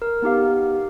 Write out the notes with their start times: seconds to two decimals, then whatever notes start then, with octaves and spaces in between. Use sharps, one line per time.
0.02 A#4
0.22 B3 D#4 G4 F5